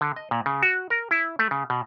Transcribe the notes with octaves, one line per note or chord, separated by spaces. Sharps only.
D3
D#5
A#2
C#3
F#4
A#4
E4
A3
C#3
B2